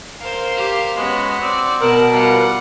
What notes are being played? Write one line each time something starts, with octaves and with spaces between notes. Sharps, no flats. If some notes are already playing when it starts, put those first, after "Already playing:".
A#4 C5 F5
G4 F5
G#3 B3 C#4 F#4
C4 D5
B2 A#4 F#5 A5
G3 F4 F#5